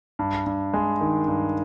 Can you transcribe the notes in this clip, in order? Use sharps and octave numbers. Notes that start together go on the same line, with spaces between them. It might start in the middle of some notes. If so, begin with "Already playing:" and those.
G2
G2
G#3
D#3
G2